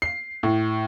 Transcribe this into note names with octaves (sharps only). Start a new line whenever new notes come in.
C7
A2